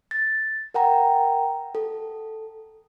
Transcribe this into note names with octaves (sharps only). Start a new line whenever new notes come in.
A6
A#4 F#5 G5 A#5
A4